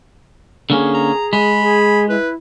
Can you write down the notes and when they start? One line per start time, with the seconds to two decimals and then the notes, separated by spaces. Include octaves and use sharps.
0.70 D3 A#3 C#4 G#4
0.94 A#5
1.33 G#3 B5
1.61 G#4
2.09 E4 B4